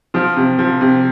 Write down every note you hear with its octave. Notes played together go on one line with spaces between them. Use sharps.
F3 F4
C3
F3
C3